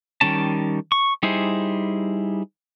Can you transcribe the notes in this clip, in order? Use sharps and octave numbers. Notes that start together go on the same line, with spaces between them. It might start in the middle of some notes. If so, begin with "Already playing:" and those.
D#3 G3 C#4 A5
C#6
G3 D#4 E4 G#4 C5